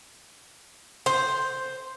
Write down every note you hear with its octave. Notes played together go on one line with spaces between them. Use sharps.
C5